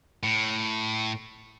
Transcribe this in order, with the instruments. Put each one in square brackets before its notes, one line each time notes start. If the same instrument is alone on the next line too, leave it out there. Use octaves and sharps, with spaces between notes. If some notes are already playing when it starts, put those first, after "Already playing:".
[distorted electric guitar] A2